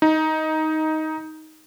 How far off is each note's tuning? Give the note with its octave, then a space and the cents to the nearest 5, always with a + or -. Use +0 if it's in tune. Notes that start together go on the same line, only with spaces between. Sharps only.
D#4 +10